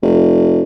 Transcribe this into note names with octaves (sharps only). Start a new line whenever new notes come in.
F1